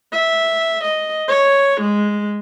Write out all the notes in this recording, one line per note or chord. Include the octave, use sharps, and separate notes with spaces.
E5
D#5
C#5
G#3